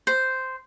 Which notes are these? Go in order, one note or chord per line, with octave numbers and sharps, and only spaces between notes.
C5